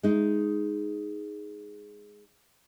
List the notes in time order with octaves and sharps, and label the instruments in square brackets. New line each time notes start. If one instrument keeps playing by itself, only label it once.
[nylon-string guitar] G#3 D#4